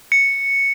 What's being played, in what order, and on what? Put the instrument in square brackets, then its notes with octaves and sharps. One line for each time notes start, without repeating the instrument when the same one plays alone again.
[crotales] C#7